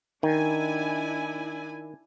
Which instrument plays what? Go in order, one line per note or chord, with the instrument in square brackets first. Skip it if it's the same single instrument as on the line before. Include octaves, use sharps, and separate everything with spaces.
[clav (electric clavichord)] D#3 [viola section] D4 E4 G#5